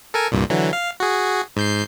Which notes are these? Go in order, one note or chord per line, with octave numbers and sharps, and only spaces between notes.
A4 A#4 G#5
C2 G2 A#2
D3 E3 F#3
F5
F#4 G#4
G#2 G6 C7